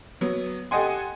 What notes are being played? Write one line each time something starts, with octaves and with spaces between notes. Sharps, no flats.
F#3 B3
G4 A4 D#5 F#5 G#5 C6